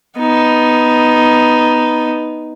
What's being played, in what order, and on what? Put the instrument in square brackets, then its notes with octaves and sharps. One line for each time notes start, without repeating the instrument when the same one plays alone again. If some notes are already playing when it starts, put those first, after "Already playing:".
[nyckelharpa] B3 D#4